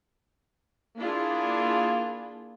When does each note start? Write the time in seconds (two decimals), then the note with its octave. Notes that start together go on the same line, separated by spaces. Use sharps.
0.98 A#3 D4 E4 F4 G#4